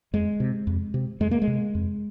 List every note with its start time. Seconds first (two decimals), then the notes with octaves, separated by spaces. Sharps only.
0.13 F2 G#3
0.40 C3
0.67 F2
0.94 C3
1.20 F2 G#3
1.31 A#3
1.42 G#3
1.47 C3
1.75 F2